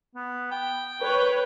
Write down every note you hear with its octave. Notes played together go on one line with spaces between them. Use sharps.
B3
G5
B4 C#5